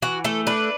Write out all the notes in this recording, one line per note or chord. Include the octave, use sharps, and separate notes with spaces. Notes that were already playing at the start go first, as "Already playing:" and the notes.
E3 F#4
A3 A4
D4 B4